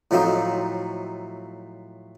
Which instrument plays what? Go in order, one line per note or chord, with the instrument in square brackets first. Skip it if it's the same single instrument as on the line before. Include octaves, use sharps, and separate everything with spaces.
[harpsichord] A2 F3 F#3 A3 C4 D#4